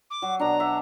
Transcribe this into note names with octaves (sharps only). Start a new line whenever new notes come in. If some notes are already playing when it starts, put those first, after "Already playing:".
D6
F#3
B2 D4 A#5
E5